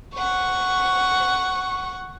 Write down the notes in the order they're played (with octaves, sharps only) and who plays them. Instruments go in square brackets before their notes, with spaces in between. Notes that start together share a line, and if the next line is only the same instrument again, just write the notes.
[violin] F#5 C#6